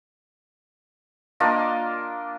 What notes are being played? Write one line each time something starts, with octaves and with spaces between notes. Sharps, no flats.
A#3 D4 F4 D#5